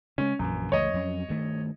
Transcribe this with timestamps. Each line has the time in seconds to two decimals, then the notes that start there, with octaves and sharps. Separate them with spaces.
0.18 C#3 G#3 C#4
0.39 A#1 F#2 E3
0.72 C#2 E3 A3 C#5 D#5
0.94 F2 F#3 C#4
1.28 G2 D#3 A3